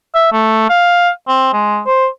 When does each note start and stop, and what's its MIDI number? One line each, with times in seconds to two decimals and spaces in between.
0.15 0.28 76
0.33 0.65 57
0.70 1.10 77
1.28 1.53 60
1.53 1.81 56
1.86 2.07 72